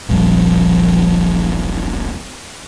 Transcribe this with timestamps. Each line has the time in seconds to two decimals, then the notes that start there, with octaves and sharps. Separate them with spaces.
0.09 D#1 A#1 F2 G3